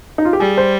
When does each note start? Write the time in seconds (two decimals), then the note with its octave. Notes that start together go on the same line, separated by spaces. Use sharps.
0.18 D#4
0.25 F4
0.33 G4
0.40 G3 G#4
0.57 C5